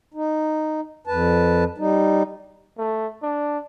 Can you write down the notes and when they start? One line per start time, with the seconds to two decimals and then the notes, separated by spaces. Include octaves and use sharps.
0.14 D#4
1.07 F2 B4 A5
1.78 G3 D#4
2.78 A3
3.23 D4